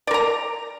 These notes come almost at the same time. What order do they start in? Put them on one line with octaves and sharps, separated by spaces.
D5 A#4 A#5